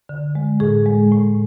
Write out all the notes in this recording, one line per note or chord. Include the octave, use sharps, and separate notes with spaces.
D3
G#3
A2 G#4
G#3
A2